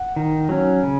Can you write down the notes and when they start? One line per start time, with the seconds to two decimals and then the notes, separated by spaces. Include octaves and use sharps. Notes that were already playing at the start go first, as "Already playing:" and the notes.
Already playing: F#5
0.16 D#3
0.49 F#3 C#4
0.83 C#3